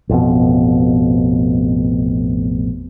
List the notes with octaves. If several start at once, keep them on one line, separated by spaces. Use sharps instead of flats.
A1 F2 B2